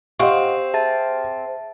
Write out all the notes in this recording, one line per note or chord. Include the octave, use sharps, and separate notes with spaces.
C4 G4 D#5 F5 F#5 C#6
G#4 E5 A5 A6